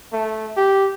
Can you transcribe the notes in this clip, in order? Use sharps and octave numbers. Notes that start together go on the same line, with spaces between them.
A3
G4